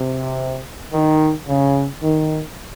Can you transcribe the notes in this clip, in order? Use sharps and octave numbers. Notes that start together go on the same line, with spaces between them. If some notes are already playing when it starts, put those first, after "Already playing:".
Already playing: C3
D#3
C#3
D#3